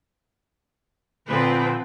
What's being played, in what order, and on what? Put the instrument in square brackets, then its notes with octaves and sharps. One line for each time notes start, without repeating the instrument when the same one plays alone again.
[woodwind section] A#2 D3 [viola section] F3 C4 B4